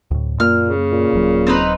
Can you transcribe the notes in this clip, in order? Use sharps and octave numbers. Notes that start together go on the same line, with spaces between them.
D2 A2
F#2 A#2 A#3 F6
C#3
A#2
D#1 F#3
C4 D#4 B4